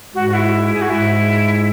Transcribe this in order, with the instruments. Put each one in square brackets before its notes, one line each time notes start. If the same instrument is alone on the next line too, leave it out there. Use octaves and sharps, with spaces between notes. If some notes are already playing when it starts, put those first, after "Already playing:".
[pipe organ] G#2 [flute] F#4
[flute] F#4
E4
G#4
F#4
[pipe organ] G#2 [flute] E4